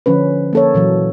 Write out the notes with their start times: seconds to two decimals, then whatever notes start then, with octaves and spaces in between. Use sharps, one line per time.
0.06 D3 F3 C#4 B4
0.53 A#3 A4 C#5
0.74 A#2 E3 F#3